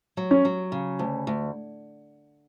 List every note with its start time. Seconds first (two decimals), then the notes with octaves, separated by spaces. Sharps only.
0.17 F#3
0.31 C#4
0.45 F#3
0.72 C#3
0.99 D2
1.27 D2